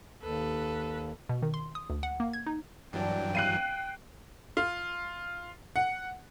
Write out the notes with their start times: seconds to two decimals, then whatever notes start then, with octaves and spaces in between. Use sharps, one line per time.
0.22 D#2 A4 B4
1.29 B2
1.42 D#3
1.54 C6
1.75 D#6
1.90 D2
2.03 F#5
2.20 A#3
2.33 G#6
2.46 D#4
2.93 G2 E3 F#3 D4 G5
3.35 F5 F#6 C7 D#7
4.57 F4
5.76 F#5